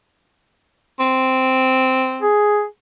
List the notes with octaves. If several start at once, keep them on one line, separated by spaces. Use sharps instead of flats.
C4
G#4